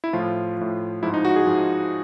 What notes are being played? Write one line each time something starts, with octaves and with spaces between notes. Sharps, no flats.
E4
A2 F3 F4
A2 F3
G#2 F3 E4
D#4
F#4
G#4
G#2 F3